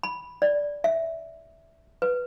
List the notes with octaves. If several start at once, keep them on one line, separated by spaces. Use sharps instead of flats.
B5
D5
E5
B4